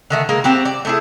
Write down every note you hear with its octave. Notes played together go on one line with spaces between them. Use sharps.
D3 D#3 A3
G#3 A#3 A#4
C4 F#4 G4
D5
A3 E4 G#4